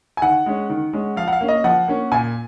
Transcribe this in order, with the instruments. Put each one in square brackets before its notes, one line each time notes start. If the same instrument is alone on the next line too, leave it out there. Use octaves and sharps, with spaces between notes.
[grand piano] G#5
D#3 F#5
G#3 C#4
D#3
G#3 C#4
F3 F5
F#5
F5
A#3 C#4
D#5
F3 F#5
A#3 C#4
A#2 G#5